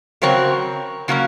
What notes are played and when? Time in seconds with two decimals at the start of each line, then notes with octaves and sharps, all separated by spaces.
0.22 C#3 F#3 C4 A#4 C#5
1.08 C#3 F#3 A#3 C#4